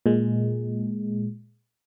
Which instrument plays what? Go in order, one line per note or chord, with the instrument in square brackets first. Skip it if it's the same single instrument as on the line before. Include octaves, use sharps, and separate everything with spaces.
[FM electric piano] A#2 G#3